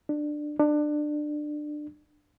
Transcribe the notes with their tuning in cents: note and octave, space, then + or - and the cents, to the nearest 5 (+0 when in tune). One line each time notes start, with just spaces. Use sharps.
D4 +20
D4 +25